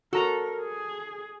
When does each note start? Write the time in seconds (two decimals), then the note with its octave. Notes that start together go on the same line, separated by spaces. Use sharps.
0.13 F#4 A4 A#4 A#5
0.61 G#4